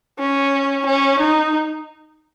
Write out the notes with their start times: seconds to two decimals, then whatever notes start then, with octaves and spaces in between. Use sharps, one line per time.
0.19 C#4
0.86 C#4
1.20 D#4